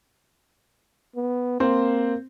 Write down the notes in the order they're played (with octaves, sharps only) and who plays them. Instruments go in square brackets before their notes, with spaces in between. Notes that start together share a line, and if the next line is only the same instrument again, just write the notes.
[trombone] B3
[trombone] A#3 [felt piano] C4 C5 C6